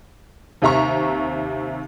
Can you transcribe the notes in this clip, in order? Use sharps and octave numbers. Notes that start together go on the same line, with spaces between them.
D#2 C3 E5 A#5 C#6